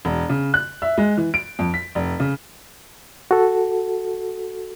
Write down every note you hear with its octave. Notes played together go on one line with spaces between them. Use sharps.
E1
C#3
F#6
E5
G#3
E3
D7
F2
B6
F1
C#3
F#4 A4